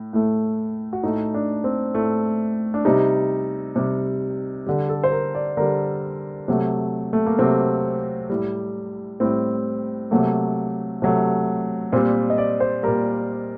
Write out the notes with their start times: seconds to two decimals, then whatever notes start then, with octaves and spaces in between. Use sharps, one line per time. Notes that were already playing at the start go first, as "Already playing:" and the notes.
Already playing: A2
0.13 A2 A3
0.93 F#4
1.03 A2 A3 D#4
1.34 D4
1.64 C4
1.94 A2 A3
2.74 D4
2.85 C3 G3 D#4
3.76 C3 G3
4.66 D3 G3 G4
4.89 A4
5.04 C5
5.12 A#4
5.35 D5
5.57 D3 G3 A#4
6.48 C3 F#3 A3
7.13 A3
7.26 A#3
7.39 C3 F#3 A3 C4
8.30 A2 G3
9.20 A2 G3 C4
10.11 C3 F#3 A3 A#3
11.02 C3 F#3 A3
11.92 A#2 C4
11.96 G3
12.30 D#5
12.38 D5
12.60 C5
12.83 A#2 G3 A#4